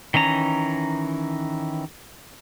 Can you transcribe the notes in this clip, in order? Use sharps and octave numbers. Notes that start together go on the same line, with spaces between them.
D#3 E3 C#4 A#5